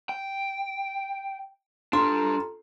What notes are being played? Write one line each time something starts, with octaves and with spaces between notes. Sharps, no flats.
G5
D4 F4 G4 A4 A#5 C6